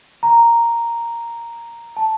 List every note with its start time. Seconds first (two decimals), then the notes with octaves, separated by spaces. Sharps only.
0.23 A#5
1.97 A5